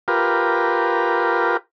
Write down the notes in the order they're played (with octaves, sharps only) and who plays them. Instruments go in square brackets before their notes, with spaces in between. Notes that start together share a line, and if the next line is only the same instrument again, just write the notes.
[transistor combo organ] F4 G4 A#4 B4